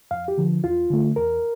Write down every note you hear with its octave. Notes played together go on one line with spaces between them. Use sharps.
F2 F5
G4
D3 F3
E2 F4
D3 A3
E2 A#4